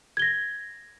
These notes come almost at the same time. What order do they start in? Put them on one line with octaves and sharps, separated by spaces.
G#6 G7 A#6